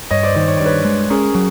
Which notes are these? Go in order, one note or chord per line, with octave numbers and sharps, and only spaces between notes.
G2 C#5 D#5
C5 D5
D#3 C5 D5
C#5
G2 D5
B4 C#5
G#3
C#4 G#4 A#4
F#3